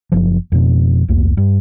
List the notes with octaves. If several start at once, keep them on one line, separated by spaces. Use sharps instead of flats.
F#1 F3
F2 B2
D#1 C2 F2 A#3
G2